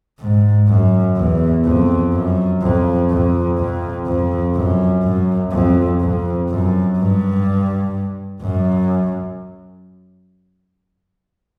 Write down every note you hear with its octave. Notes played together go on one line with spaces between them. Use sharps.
G#2
F#2
E2
F2
F#2
F2
F2
F2
F2
F#2
F#2
F2
F2
F#2
G2
F#2